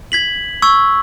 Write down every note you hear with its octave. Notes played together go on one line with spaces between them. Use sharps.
G#6 B6 F#7
C#6 E6 G#6